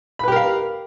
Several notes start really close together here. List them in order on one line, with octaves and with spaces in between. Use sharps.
B5 B4 G4 A#4 F5